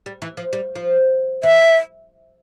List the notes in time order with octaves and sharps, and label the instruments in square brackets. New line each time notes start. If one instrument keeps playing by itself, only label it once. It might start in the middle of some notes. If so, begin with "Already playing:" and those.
[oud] G3
E3
F3
G3
F3
[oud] E3 [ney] E5